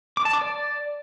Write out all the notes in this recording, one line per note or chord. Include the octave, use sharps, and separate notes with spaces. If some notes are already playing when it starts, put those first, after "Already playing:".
D6
A5
D6
D5